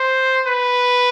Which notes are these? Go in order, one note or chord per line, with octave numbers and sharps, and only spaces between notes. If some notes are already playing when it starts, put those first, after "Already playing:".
Already playing: C5
B4